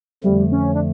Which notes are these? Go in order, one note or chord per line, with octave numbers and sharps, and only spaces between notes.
F2 D3 F3 G3 A3
C#4
D4